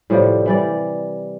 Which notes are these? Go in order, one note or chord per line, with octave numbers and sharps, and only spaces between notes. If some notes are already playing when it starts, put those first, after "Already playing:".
A2 C3 F3 G3
E3 G3 D5